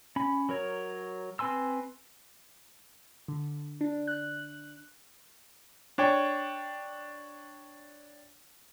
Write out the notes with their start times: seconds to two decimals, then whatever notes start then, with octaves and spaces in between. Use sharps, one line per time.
0.16 C#4 B5
0.49 F#3 A#4 C#5
1.39 C4 B4 G#5 C6 E6
3.28 D3
3.81 D4
4.07 F#6
5.98 D4 C#5 G5